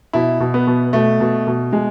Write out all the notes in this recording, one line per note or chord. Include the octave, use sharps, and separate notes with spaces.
B2 E4
B2
B3
B2
B2 A3
B2
B2
B2 G#3